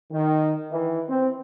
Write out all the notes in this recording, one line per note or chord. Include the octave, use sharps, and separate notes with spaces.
D#3
E3
C4